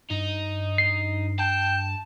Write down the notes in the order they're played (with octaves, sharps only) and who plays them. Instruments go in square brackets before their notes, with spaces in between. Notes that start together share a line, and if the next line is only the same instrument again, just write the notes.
[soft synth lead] G2 [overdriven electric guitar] D#4
[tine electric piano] C7
[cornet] G5 [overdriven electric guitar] A5